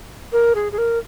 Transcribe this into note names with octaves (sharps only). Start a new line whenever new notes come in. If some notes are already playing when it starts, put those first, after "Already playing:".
A#4
G#4
G#4
A#4